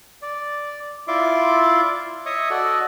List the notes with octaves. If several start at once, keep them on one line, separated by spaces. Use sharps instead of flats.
D5
E4 F4 D5 E5 C6 D6
C#5 D#5 E5 C#6 D#6
F#4 A4 D5 D#5